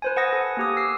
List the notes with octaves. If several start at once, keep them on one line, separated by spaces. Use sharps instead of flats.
B4 C5 G#5
B4 F#5 D#6 A#6
A4 G#5
A#3 G4 D#6
E6 C7